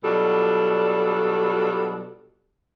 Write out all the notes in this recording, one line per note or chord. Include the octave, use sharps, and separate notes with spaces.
B2 F#3 G3 D4 F4 A4